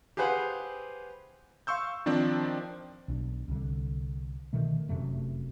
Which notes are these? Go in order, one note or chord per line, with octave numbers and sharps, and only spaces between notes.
G4 G#4 B4 C5 F5 F#5
F5 C6 C#6 E6 G6
D#3 F3 C4 D4
B1 C4 D4
C2 D3
B2 D3 D#3 A3
F1 F#2 C3 A3